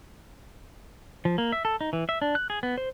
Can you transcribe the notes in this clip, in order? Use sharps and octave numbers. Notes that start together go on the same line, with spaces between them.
F3
A#3
E5
A4
D#4
E3
E5
D4
F#6
G#4
B3
C5